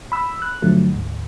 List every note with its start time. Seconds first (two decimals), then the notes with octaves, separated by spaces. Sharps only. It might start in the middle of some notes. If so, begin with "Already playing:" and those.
0.12 B5 E6
0.42 F#6
0.62 G2 D3 F3 F#3 A3
0.90 D2 G#2